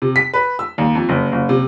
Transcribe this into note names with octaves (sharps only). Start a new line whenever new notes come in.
C3
B6
B4
E6
D#2
F2
F#1
F#1
C3